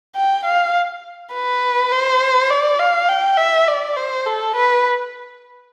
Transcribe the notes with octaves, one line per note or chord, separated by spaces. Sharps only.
G5
F5
B4
C5
D5
F5
G5
E5
D5
C5
A4
B4